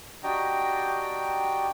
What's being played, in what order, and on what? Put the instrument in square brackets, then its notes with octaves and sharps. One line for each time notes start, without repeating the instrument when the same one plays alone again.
[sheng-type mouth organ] D4 F#4 G4 D#5 G5 A#5